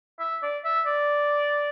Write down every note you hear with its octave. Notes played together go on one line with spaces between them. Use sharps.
E5
D5
E5
D5